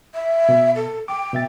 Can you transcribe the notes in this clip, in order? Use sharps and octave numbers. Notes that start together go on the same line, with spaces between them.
E5
B2
A4
G5 D6
B2 E5 A6